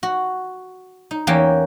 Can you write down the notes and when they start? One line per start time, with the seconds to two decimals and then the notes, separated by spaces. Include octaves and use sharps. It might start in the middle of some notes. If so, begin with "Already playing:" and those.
0.03 F#4
1.11 D#4
1.27 E2 E3 A#3 C#4 G4 G5